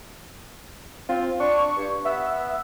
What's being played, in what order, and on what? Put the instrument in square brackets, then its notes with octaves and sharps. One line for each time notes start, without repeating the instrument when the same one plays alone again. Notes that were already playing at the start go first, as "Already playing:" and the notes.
[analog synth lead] C4 [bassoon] F4
[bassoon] D4 [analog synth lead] C#6
[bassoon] G2
[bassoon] B3 [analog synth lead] E5